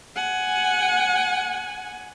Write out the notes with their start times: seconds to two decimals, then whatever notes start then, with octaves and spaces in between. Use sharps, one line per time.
0.16 F#5 G#5